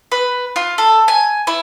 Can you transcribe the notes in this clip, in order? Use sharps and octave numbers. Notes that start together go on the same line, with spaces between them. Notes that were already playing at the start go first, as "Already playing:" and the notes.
B4
F4
A4
G#5
E4